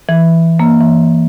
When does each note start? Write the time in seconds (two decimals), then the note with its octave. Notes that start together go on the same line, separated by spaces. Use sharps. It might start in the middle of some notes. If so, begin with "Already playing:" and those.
0.09 E3
0.59 A#3
0.80 E3